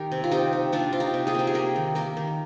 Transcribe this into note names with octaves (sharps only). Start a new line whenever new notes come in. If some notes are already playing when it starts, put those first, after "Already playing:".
Already playing: D#3 G4 A#4
C3
F4
C3 D#4 G4
C3
C3 D4 F4
C3 F4
D#4 G4
C3
F4 G#4
A#3 G4
G#4
A#3 G4 A#4
D#3
A#3 G4 A#4
D#3